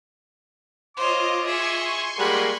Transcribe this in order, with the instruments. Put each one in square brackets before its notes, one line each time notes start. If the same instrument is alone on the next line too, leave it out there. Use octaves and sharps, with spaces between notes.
[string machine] F4 D#5 [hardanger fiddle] C5 C#5 [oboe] D6
[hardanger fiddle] G#4 E5 [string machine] G#5 C6 C#6
[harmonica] G3 G#3 A#3 [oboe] F#5 [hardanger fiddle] B5